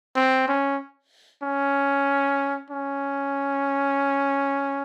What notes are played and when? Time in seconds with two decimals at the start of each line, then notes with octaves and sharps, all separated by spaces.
0.16 C4
0.48 C#4
1.43 C#4
2.70 C#4